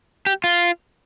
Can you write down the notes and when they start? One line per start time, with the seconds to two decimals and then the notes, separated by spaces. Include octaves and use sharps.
0.26 G4
0.44 F4